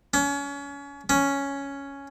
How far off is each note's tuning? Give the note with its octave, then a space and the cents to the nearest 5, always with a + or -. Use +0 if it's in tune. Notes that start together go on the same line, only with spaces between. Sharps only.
C#4 +30
C#4 +5